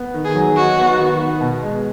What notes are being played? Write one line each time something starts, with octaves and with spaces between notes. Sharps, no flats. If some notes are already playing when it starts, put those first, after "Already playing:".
Already playing: B3
D#3
G#4
F#3
D#4 F#4
B3
D#3
B3
B2
G#3